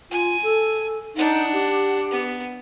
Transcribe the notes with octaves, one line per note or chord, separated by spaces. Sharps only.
F4 G#5
A4
D4 D#4 F#5
G4
B3